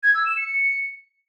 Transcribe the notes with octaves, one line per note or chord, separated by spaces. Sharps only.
G#6
E6
E7
C#7